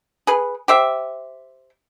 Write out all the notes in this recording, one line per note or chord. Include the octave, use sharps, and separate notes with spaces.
G#4 B4
G4 C5 E5